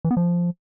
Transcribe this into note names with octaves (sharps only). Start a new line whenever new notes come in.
E3
B3
F3